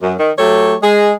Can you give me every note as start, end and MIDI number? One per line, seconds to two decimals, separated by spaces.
0.02 0.14 42
0.20 0.31 51
0.38 0.74 54
0.38 0.74 57
0.38 0.74 67
0.38 0.74 69
0.38 0.74 73
0.82 1.12 56
0.82 1.12 68